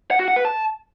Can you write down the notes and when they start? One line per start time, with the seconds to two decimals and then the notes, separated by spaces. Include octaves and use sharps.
0.11 F#5
0.19 F#4
0.28 F#5
0.36 B4
0.45 A5